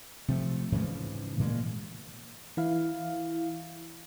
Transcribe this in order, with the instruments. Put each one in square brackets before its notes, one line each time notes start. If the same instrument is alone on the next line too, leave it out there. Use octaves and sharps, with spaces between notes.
[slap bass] C3 F3 A3
G#2 C#3 E3 F3
A#2 E3 G#3 A#3
[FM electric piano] E3 E4 F5